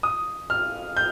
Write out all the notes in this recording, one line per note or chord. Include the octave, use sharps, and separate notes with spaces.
D#6
F6
G6